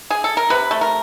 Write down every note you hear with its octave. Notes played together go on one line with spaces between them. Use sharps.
G#4
A4
A#4
C3 B4
A3
A#4